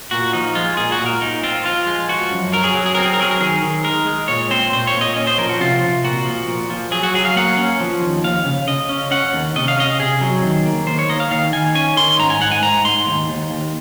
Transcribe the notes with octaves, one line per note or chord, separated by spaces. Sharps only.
A#2 F#4
F3 D#4
G#3 F4
A#2 G#4
F#4
A#2
A#4
A#2 D#4
C4 F4
F3 F4
G#3
F3 F#4
F#2
F#3 A#4
G#4
F#3
G#4
C4 A#4
G#4
A#4
F#3 G#4
A#4
D#3 G#4
D#3
G#3 A#4
G#3
A#2 C#5
C4 C5
A#2 C5
C#5
A#2
D#5
C#4 D#5
C5
F3 A#4
F#4
C3 F4
C3
A#2 F#4
F3
A#2
F3
F#3 G#4
F#4
F#3 G#4
F5
A#3 F#5
C#4
F3
D#2
D#2 F5
C#3
C#3 D#5
C#4
C#4 F#5
D#2
C3 D#5
F5
C#4 D#5
C3 G#4
F#3
D#3
A#3
D#3 C5
C#5
A#3 D#5
F5
D#3 F5
D#3 G#5
C#4 G#5
D#3 C6
G#2 A#5
G#5
G#2 F#5
G#5
G#2 A#5
G#2 C6
D#2
D#2
D#2